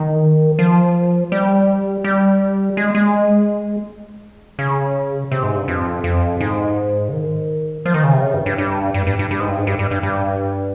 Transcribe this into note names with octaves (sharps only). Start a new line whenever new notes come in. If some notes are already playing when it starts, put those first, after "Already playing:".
Already playing: D#3
F3
G3
G3
G#3
G#3
C#3
C3
G#2
G2
F2
F2
G#2
C#3
D#3
F3
D#3
C#3
C3
C#3
G2
G2
G2
G2
G2
G2
G2
G#2
G2
G#2
G2
G2
G2
G2